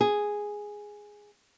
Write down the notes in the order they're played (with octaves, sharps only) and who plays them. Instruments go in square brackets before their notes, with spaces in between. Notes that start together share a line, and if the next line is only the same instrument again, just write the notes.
[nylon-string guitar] G#4